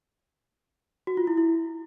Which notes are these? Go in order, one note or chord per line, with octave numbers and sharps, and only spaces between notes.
F#4
F4
E4
E4